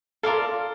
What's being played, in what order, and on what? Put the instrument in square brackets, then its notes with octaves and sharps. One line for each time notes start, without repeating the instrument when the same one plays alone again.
[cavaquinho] F4 A#4 D5 F5 [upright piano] A4